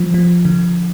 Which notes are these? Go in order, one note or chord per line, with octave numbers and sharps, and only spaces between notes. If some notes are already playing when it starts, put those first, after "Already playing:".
Already playing: F3
F3
D3